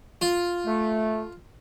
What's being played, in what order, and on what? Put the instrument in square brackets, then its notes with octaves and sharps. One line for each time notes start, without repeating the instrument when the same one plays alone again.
[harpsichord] F4
[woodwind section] A3